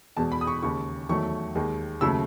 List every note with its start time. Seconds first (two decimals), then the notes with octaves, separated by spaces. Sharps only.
0.17 E2 B2 G#3 A5
0.32 B5
0.41 D#6
0.47 C#6
0.63 D#2 C#3 G#3 C#6
1.09 E2 D#3 F#3 A3 C#6
1.55 D#2 D#3 G#3
2.01 D#2 C#3 F#3 A3 E6